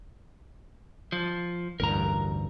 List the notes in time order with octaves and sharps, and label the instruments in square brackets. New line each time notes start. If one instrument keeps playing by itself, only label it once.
[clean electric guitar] F3
[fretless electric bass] A1 D2 G2 [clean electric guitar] A#4 A#5